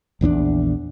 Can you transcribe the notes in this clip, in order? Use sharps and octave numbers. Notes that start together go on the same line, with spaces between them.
A#1 E2 C4 D4